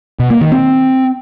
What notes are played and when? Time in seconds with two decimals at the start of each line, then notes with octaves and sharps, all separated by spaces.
0.20 B2
0.30 A#3
0.41 D#3
0.52 C4